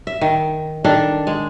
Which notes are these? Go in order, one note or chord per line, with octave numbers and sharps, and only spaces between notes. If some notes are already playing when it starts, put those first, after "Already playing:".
E5
D#3
D#3 D4 A4
G#3